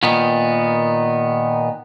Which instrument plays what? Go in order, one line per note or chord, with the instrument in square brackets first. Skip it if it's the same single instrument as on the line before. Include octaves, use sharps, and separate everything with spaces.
[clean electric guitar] A#2 D#3 B3